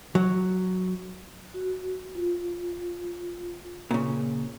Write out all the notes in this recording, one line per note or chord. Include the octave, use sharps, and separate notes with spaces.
F#3
F#4
F4
A#2 C#3